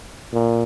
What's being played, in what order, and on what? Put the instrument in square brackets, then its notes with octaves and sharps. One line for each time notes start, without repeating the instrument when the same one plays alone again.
[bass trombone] A#2